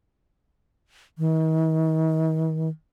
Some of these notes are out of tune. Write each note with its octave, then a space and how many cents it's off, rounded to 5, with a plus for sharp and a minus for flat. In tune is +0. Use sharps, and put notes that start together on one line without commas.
D#3 +45